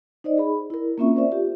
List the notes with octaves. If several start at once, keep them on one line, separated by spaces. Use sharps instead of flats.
D#4 C5 D5 D#5
G#4 B5
E4 A#4
A#3 C4 C#4 F4 E5 C#6
A#4 C5 D5 E5
F4 G4